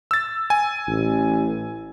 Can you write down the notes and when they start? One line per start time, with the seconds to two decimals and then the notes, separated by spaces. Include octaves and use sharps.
0.11 E6 A6
0.50 G#5
0.88 A1